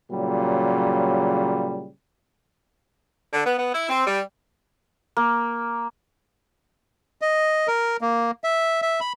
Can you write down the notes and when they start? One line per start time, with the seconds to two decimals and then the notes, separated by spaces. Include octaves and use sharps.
0.11 A#2 C#3 F#3 G3
3.33 D3
3.46 B3
3.59 B3
3.74 E4
3.90 C4
4.07 G3
5.17 A#3
7.22 D#5
7.68 A#4
8.01 A#3
8.44 E5
8.82 E5
9.01 B5